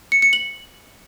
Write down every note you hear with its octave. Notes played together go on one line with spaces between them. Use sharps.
C#7
C#7
F#7